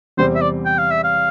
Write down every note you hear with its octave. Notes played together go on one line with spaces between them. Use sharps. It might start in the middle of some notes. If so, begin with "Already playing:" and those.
E2 C3 G3 C4 C5
E5
D5
G5
F5
E5
F5